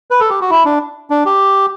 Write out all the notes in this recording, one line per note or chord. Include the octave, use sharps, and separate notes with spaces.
B4
A4
G4
F#4
E4
D4
D4
G4